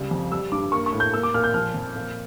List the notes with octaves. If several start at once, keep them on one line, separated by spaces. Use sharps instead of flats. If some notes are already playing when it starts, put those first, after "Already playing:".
Already playing: C#2 G3
F2
G3 E6
G2 D6
A#3 C#6
C#6
A2
G6
A#3 E6
D6
A#2 F6
G6
F3 F6
F2
A#2